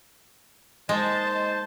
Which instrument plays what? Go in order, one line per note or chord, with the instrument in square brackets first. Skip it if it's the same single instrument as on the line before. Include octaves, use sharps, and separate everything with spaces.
[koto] G#3 [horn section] A#3 D#4 C5 [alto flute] D#5 [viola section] A5